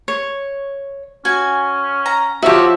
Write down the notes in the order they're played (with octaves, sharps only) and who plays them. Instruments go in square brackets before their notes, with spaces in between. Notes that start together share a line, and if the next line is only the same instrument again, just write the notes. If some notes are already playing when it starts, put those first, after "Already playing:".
[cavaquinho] C#5
[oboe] C#4 [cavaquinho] F#4 [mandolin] G#5
[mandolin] A#5
[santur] F3 C#5 E5 [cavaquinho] F#4 G4